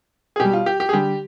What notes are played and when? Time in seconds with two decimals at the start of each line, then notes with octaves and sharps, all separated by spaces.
0.36 G#4
0.40 B2 G3 G4
0.53 F4
0.66 G4
0.80 G4
0.89 G#4
0.93 D3 G3 G4